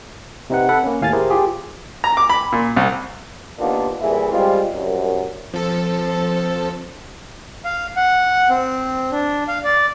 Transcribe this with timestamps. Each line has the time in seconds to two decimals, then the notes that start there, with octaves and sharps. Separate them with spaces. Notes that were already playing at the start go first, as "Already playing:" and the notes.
0.50 C3 C4 D#4 B4 F#5
0.69 A4 F#5 B5
0.83 A#3 C#4
1.01 D#2 A2 F5 G#5 F6 A6
1.13 E4 G4 G#4 A#4 C5
1.30 F4 G4 G#4
2.04 A#5
2.17 D6
2.30 B5
2.52 A#2
2.76 C2
3.59 D#2 A#3 B3 D4 F4
4.01 C2 A#2 E3 E4 G#4
4.31 G3 G#3 C4 F4
4.73 C2 F#2
5.53 F3 C4 A4
7.65 F5
7.96 F#5
8.50 C4
9.11 D4
9.48 F5
9.64 D5